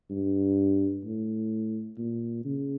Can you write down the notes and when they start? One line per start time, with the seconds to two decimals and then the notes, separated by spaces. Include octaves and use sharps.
0.10 G2
1.04 A2
1.98 A#2
2.45 C#3